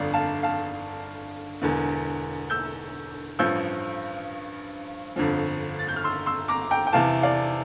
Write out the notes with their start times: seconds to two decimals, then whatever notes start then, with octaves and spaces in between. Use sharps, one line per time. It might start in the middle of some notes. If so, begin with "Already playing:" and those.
Already playing: G1 F2 D3 D5 F5
0.13 F5 A5
0.43 F5 A5
1.62 E1 E2 D3
2.50 E6 G6
3.39 A1 G2 F3 E6 G6
5.16 G1 F2 D3 F3
5.79 A6
5.88 G6
5.96 F6
6.04 C6 E6
6.26 C6 E6
6.48 A#5 D6
6.71 G5 A#5
6.87 G5
6.93 E2 C3 E3 F5 A5
7.23 D5 F5